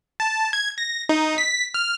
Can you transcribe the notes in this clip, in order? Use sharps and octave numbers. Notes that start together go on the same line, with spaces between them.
A5
G#6
A#6
D#4
B6
F6